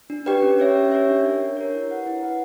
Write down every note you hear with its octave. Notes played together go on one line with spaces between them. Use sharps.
D4
G4 B4 D5 G5
C#4
G4 C#5 E5
C#4
G4 C#5 E5
D4
A#4 C#5
D4
A#4 C#5
E4
B4 F#5
E4
B4 F#5